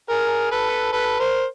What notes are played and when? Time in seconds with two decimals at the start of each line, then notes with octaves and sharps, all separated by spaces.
0.09 G#4 A#4
0.51 A4 B4
0.92 A4 B4
1.19 A#4 C5